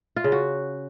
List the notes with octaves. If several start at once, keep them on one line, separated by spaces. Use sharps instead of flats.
F4
C#3
F#4